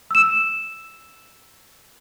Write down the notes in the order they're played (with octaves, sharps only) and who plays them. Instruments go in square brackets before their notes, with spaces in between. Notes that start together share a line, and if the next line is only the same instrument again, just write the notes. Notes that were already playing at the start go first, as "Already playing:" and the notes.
[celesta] E6 E7